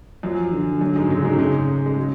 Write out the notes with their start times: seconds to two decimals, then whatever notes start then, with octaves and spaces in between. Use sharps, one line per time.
0.23 F#2 F3 F#3
0.53 D3
0.81 F#2 F#3
0.96 G#2 G#3
1.10 F#2 C#3 F#3
1.25 G#2 G#3
1.33 A3
1.38 G#2 C#3 G#3
1.86 G#3
1.97 F#3